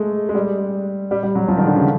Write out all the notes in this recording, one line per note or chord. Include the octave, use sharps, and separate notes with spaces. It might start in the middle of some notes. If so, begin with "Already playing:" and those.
Already playing: G#3 A3
G#3
G3
G3
G3
F#3
F3
D#3
D3
C#3